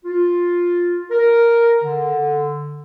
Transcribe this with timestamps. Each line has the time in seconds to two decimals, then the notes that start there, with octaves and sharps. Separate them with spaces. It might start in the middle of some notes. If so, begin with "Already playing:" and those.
0.05 F4
1.11 A#4
1.83 D3